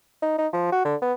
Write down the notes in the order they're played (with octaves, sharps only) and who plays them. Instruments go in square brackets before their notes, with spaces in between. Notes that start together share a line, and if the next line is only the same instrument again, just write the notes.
[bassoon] D#4
D#4
F3
F#4
D3
B3